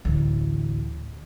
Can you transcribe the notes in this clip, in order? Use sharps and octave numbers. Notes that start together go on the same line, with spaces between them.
A1 D2